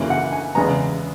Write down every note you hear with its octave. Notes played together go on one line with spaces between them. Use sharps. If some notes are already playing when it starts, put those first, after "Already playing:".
Already playing: F#2 C#3 E3 A#3
F#5
G#5
E2 C#3 G#3 B3 A#5